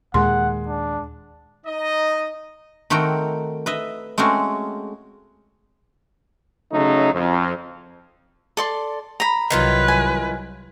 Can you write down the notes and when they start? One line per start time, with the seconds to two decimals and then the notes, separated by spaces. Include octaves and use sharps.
0.14 D#2 A#2 D#3 G#3 F#5 C6
0.68 D4
1.66 D#4 D#5
2.90 D#3 A3 C4 F#4 A#4 G5
3.66 B4 D#5 E5
4.18 G#3 A3 C4 C#4 F#4
6.73 C#3 F#3 A3 D#4
7.14 F2
8.57 A4 D5 C6
9.20 A#5 B5
9.51 C2 D#3 E3 F#3 F4 B4
9.88 G#5